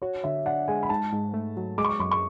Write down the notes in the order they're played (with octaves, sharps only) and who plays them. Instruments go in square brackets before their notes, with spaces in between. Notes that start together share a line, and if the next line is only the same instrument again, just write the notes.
[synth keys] F#4 [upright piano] C#5
[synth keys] D3 [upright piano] E5
[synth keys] D4 [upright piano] F#5
[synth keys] G#3 [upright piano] G#5
[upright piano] B5
[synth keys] G#2 [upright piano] A5
[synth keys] G#2
A3
F#3
[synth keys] G#3 [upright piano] D6
[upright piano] C#6
D6
[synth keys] F#2 [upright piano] C#6
[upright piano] C#6